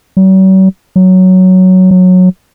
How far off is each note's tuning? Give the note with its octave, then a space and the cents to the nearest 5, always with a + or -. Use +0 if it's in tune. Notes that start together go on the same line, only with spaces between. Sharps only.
F#3 +45
F#3 +5
F#3 -15